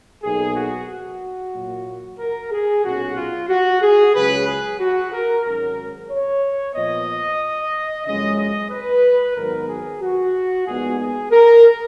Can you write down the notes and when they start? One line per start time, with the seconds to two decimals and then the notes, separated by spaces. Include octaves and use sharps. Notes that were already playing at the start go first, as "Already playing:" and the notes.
0.23 B1 B2 A#3 D#4 G#4
0.56 F#4
0.89 F#4
1.54 A#2 F#3 A#3
2.19 A#4
2.51 G#4
2.84 B1 A#2 F#3 C#4 F#4
3.17 F4
3.49 F#4
3.82 G#4
4.15 C#2 C#3 F#3 C#4 B4
4.48 G#4
4.80 F#4
5.12 A#4
5.45 G#1 G#2 F#3 C#4 A#4
6.11 C#5
6.75 A#2 F3 B3 D#5
8.06 F#1 F2 C#3 G#3 C#4 D#5
8.39 D#5
8.71 B4
9.36 G#1 G#2 D#3 F#3 B3 A#4
9.69 G#4
10.02 F#4
10.66 A#1 A#2 G#3 B3 D#4 G#4
11.00 G#4
11.32 A#4